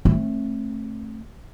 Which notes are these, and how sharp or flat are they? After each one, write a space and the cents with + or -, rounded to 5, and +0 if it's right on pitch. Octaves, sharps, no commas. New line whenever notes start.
A3 +0 C4 +35